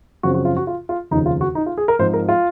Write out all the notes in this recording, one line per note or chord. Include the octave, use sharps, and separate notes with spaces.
F#2 C#3 F3 C4 F#4
F#4
F4
F#4
F4
F4
F1 D#2 C#3 F3 D#4
F4
F#4
D#4
F4
G#4
A#4
G#2 F3 C4 C5
A#4
F4